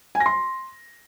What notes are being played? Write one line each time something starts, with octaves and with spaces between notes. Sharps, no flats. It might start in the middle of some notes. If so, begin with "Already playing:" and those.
G#5
A#6
C6